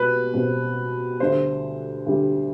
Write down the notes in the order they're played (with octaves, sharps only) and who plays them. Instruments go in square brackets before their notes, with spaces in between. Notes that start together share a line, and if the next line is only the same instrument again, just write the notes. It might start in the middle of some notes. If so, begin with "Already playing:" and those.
Already playing: [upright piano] B2 G3 [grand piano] B4
[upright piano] B2 G3 C4
[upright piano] D2 D3 G3 [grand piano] C5
[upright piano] D2 D3 G3